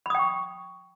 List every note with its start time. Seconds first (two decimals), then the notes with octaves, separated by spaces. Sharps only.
0.06 B5
0.10 D#6
0.15 G5
0.19 C#6